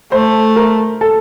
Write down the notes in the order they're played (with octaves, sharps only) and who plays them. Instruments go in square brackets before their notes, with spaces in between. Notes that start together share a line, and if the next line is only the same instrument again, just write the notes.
[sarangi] A3 [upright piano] C5
[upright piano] A#4
A4